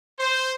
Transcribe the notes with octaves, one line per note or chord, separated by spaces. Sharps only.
C5